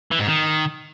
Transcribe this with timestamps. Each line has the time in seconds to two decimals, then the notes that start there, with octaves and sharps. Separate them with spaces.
0.11 E3
0.19 G#2
0.27 D#3